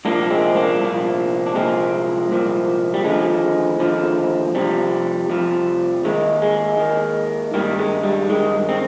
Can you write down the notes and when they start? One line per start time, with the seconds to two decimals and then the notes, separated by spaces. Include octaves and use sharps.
0.05 C2 A#2 F3 A#3 D4
0.30 G#3 C4
0.55 A#3 D4
0.80 C2 A#2 F3
1.46 D4
1.55 C2 A#2 F3 G#3 C4
2.30 C2 A#2 F3
2.94 G3
3.04 D#2 D3 F3 G#3
3.80 D#2 D3 F3
4.55 F2 C3 F3 G3
5.29 F2 C3 F3
6.05 D#2 D#3 G#3
6.42 G#3
6.80 D#2 D#3
7.54 G2 D#3 G3 A#3
7.79 G#3
8.03 G3
8.29 G2 D#3 G#3
8.69 C4